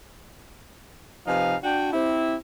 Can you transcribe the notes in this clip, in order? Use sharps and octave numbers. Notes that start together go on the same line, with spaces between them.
C3 F3 D#4 B4 F5 G#5
D4 F#4 G5
C4 E4 G4